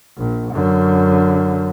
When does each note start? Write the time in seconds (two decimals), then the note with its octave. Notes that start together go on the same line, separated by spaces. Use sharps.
0.17 A#1
0.52 F#2 D3